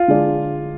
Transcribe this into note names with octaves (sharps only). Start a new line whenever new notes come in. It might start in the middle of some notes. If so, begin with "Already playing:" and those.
Already playing: F4
D3 G#3 D4 G#4 D5